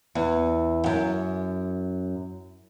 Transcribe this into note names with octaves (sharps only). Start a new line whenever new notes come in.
E2
F#2